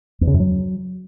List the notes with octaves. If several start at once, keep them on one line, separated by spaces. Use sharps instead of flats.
E2
C#3
F#2
F#3